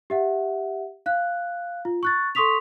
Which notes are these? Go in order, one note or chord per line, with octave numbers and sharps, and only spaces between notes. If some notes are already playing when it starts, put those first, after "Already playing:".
G4 E5 F#5
F5 F#6
F4
C#6 F#6 A6
A4 C6 C#6 D#6 B6 F7